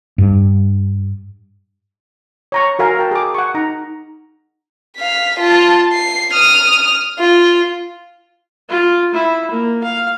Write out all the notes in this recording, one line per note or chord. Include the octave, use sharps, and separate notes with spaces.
G2
C#5 A#5 C#6
F#4 A#4 F5 G#5
A#4 G5 A5
G#4 D6
F#5 C#6
D#4 A#5
F5 B6
F4 A5
C7
D#6 F6
F4
F4
E4
A#3
F5